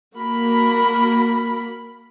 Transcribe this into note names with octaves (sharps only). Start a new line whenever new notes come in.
A#3 F#4 A#4 B5